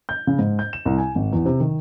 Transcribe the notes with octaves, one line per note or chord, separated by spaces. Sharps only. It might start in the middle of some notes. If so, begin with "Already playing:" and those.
G6
C#3
G#2
G6
E7
C2
G#5
G#1
E2
C3
D#3